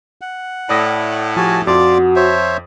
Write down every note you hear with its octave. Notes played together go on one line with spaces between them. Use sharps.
F#5
A2 D5 D#6 A#6
F3 F#4 G4 G#5 A5
F2 F4 F#4 D5 D6
C5 C#5 E5